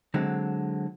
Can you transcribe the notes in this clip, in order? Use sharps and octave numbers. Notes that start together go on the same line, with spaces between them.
D3 F#3 G#3 C4